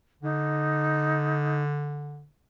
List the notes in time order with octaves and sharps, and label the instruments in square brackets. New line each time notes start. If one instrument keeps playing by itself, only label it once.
[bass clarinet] D3 [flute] D#4